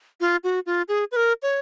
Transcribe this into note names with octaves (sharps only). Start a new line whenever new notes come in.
F4
F#4
F4
G#4
B4
A#4
C#5